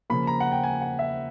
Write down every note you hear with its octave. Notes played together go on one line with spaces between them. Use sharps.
C#3 F3 A#3 B5
A#5
F#5
G5
G#5
F#5
E5